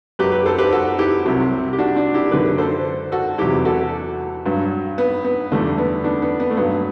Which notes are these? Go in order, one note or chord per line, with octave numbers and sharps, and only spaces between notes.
F#2 F#3 G4 B4
G4 B4
A4 C5
G4 B4
F#4 A4
E4 G4
C2 C3 F#3
G4
D4 F#4
D4 F#4
E4 G4
F#2 D3 F#3 G4 B4
A4 C5
F#4 A4
E2 C3 F#3 E4 G4
F#4 A4
G2 F#3
B3
B3
E2 D3 G3 A3
B3
B3 D4
B3
B3
A3
G2 F#3 B3